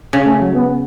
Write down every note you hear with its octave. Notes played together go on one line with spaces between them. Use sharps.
C#3 C#4
A3
F#3
B3